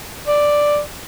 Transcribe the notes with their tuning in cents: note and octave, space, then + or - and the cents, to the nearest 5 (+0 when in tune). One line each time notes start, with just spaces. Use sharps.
D5 +0